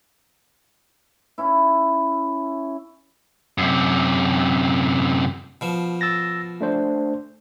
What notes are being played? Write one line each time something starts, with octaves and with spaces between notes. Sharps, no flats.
C#4 E4
F#2 C3
B2 F3
E6 A6 A#6
A3 D4 C5